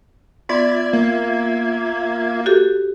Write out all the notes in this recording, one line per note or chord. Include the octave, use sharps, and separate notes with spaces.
B3 F4 D5 E5 G#6
A#3
F#4 G4 A4